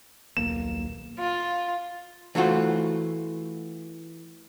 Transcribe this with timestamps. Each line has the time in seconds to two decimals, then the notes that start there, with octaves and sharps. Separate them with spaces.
0.37 D#1 B1 A#3 E7
1.18 F4
2.35 E3 A3 F4 F#4 C5